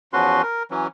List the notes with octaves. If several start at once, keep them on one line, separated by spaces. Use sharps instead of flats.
E2 F3 C#4 F#4 B4 C6
A#4
E3 F#3 C#4